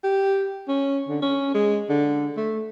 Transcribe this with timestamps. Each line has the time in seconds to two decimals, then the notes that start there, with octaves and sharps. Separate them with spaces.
0.04 G4
0.68 C#4
1.08 D3
1.22 C#4
1.54 G#3
1.89 D3
2.37 A3